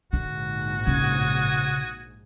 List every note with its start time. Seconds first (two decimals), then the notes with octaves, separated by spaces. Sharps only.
0.13 A#1 G#2 D3 F#4
0.87 C#3 D#6 G#6